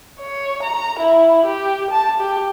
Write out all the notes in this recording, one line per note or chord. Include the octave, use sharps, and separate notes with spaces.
C#5
A#5
E4
G4
A5
G4